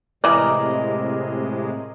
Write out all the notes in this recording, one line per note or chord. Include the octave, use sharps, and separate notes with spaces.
A2 C3 E3 G#3 A#4 D5 D#5 D6